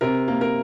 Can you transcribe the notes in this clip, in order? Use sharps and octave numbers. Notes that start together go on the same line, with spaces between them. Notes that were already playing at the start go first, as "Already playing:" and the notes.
C3 A#4
A#3
A#4